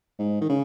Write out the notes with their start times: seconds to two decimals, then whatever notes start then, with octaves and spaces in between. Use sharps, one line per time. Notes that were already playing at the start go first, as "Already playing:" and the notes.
0.19 G#2
0.41 D#3
0.49 C#3